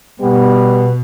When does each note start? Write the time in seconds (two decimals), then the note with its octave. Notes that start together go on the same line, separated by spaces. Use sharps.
0.21 B2 G3 B3